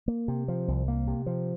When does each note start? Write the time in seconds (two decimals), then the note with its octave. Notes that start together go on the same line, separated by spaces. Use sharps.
0.08 A#3
0.28 C3
0.48 F3
0.68 C2
0.88 A#3
1.07 C3
1.26 F3